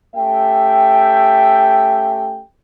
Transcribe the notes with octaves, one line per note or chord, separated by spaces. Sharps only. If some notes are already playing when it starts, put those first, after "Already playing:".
A3 C#4 G4 E5 G5